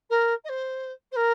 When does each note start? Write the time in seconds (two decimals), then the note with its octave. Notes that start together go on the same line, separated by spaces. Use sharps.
0.10 A#4
0.44 D#5
0.49 C5
1.12 C5
1.16 A#4